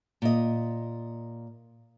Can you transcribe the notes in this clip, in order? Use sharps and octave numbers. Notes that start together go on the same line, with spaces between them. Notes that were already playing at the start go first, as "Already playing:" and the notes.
A#2 D#5